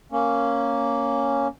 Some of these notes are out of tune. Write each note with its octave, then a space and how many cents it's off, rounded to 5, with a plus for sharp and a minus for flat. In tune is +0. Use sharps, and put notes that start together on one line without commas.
A#3 -5 C#4 +0